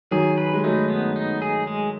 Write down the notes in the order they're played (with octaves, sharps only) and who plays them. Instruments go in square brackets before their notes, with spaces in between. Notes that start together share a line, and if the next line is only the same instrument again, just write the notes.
[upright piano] D#3 F#3 [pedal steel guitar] G#4
[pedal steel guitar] B4
[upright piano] G#3
[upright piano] F#3 A3 [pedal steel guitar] D#4
[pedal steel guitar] B3
D#4
G#4
G#3